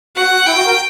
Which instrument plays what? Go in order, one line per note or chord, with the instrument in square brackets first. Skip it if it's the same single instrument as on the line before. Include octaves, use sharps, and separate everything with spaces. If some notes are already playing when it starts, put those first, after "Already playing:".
[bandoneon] F#4 [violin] F#5
[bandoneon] F#4
[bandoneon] E4 [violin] G5
[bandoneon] F#4
F#4 A#4